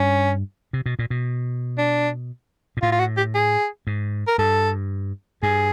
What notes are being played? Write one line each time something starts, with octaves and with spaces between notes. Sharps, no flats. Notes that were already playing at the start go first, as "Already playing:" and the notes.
Already playing: G2 C#4
C3
B2
A#2
B2
D4
A#2
A2 F4
F4
F#4
G4
G#4
G#2
A#4
G2 A4
G2 G#4